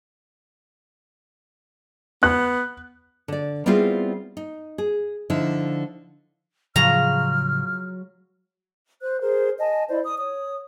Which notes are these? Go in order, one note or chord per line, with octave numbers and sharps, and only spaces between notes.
B3 F#6
D3 D5
G3 B3 C4 E4 F4 G#4
D#4
G#4
D3 F3 D#4 E4
A2 C#3 F3 F#3 F4 G#4 A#5 F6
C5 F#6
G#4 A#4 C5
D#5 G#5 A5
E4 C5 D5 D#5
D#6
C#5 D#6